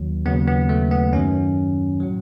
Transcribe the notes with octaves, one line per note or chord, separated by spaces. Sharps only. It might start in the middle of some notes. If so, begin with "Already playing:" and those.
Already playing: D#2 D#3 F#3
D#2 C#3 F#3 B3
B3
A3
B3
F#2 D#3 F#3 C#4
A2 F#3